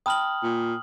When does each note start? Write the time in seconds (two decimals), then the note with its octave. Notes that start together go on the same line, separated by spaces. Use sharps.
0.06 G5 A5 B5 D#6 F6 F#7
0.43 A#2